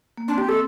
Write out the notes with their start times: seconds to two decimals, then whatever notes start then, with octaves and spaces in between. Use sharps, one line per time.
0.17 A#3
0.28 C4 D4
0.38 G4
0.49 A4